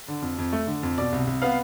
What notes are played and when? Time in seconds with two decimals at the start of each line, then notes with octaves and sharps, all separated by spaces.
0.08 D3
0.22 F2
0.38 F2
0.53 A3
0.67 D3
0.83 F2
0.98 B2 D5
1.12 C2
1.27 C2
1.42 B3 F5